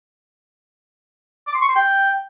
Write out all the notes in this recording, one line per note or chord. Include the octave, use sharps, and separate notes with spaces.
D6
C6
C#6
C6
G5